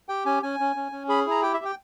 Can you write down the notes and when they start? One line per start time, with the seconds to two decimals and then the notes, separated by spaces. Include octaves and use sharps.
0.09 G4 G5
0.26 C#4 G#5
0.43 C#4 G#5
0.60 C#4
0.76 C#4
0.92 C#4
1.09 G#4 B5
1.26 E4 A#5
1.42 G4 G5
1.54 E5
1.60 G4
1.65 G5